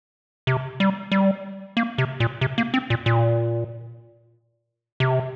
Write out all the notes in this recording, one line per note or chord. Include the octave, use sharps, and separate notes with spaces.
C3
G3
G3
A#3
C3
A#2
C3
A#3
C4
A#2
A#2
C3